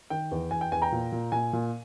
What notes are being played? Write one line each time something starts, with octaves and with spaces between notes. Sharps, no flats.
D#3 G5
E2
E2 G#5
G5
E2 G#5
G5 A#5
A#2
A#2
A#2 G#5
A#2